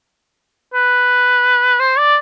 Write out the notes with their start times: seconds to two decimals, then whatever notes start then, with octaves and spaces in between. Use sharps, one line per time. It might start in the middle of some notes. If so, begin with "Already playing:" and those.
0.73 B4
1.79 C5
1.98 D5